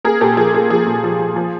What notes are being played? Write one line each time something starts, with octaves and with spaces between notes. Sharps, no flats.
A#3 G#4 A#4
A#2 G4 A4
F3 G#4
A#3 G#4
F3 G#4
A#2
F3
F3
F3